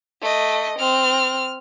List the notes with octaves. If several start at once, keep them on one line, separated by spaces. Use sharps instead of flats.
A3 D#5
C4 F6